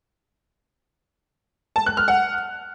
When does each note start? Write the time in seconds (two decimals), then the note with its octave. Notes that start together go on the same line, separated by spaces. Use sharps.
1.76 A5
1.86 F#6
1.97 F6
2.08 F#5